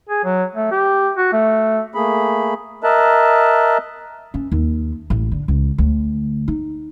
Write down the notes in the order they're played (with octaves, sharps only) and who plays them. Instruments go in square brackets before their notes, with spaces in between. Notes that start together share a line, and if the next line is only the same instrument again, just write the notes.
[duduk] G#4
F#3
A3
G4
F#4
A3
[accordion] A3 A#3 G#4 B5
A#4 D#5 E5 A5 F#6
[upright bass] C#4
D#2
A1
D3
C#2
D2
D#4